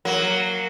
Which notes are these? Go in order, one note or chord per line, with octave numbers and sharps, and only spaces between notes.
F#3 A#3